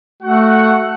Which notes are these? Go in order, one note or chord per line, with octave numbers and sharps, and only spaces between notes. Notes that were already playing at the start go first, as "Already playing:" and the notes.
A3 F#4 F#5